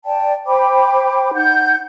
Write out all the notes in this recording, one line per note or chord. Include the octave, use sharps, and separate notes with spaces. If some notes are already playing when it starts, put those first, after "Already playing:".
D5 G5 A5
C5 G5 B5 D6
D#4 F#5 G6